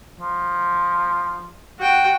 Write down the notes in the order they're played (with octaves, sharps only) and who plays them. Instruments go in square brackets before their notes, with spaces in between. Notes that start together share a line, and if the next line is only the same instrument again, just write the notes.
[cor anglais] F3
[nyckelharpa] F#4 G5